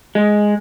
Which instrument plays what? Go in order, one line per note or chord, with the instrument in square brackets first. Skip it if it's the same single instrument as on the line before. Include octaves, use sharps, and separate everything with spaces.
[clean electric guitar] G#3